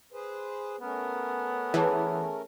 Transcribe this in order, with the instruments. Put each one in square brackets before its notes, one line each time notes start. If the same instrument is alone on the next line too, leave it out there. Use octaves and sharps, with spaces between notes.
[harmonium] G#4 B4 C5
[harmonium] A3 C#4 A#4 [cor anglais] B3
[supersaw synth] E3 [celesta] G#4 C#5 A5